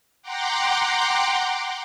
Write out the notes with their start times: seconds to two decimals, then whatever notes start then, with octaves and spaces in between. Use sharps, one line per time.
0.23 F#5 G5 A#5 C6 D6